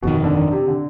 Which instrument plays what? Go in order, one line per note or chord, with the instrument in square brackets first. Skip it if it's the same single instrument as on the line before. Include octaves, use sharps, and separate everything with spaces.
[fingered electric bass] G1 F2 D#3 [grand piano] B2
[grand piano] D3
D3
C3
D3